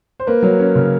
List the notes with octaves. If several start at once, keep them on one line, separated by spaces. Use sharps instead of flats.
C5
A#3 B4
F#3
C#4
C#3